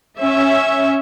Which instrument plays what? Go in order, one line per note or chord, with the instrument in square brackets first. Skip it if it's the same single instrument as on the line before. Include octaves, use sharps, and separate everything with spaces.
[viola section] C#4 E5